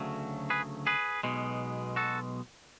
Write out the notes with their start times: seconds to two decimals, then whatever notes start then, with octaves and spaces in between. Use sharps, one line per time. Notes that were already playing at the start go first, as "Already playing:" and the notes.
Already playing: D2 C#3 F#3 A3
0.50 G#4 B4
0.87 G#4 B4
1.23 B1 B2 G#3
1.96 F#4 A4